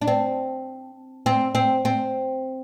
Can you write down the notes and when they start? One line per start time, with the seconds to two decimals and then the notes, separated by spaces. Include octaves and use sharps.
0.01 D4
0.08 C4
1.26 C4
1.55 C4
1.85 C4